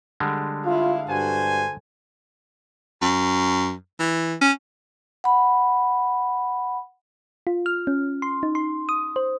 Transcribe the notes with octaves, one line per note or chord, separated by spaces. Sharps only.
D3 G3 G#3
E4 F4 F5
G2 F#4 A4 C5 G#5
F#2
E3
C#4
F#5 B5
F4
F6
C#4
C6
D#4
C6
D#6
C5